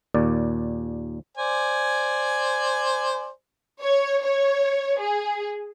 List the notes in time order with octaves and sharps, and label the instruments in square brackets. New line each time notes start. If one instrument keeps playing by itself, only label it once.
[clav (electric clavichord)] D#2 A#2 D5
[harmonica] C5 D5 G#5
[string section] C#5
C#5
G#4